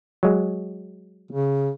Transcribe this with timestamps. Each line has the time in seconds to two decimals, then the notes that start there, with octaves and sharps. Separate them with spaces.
0.23 F#3 G#3
1.31 C#3